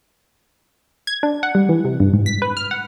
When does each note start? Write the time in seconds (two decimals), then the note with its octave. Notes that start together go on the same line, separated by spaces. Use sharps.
1.07 G#6
1.23 D4
1.43 F#5
1.55 G3
1.69 E3
1.85 C3
2.00 G2
2.14 G#2
2.26 B6
2.42 B4
2.57 F6
2.71 F#5